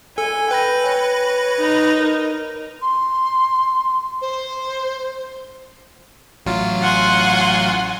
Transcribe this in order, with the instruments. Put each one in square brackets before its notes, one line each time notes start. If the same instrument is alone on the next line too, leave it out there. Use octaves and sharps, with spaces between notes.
[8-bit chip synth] A4 [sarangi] G#5
[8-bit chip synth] B4 B5 A#6 [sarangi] G5
[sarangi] C#5
[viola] D#4
[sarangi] A#4
[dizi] C6
C5
[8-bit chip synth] A1 F#3 F4
[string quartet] F#5 G#5 C6